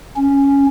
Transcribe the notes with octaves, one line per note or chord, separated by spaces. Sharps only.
C#4